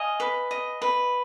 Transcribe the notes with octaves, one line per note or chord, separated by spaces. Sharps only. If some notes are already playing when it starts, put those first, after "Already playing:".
Already playing: D#5 F5 G#5
B4
D#5
B4